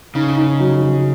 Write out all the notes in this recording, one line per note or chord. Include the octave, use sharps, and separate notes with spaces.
C#3 D#4
D#4
F#3
F#3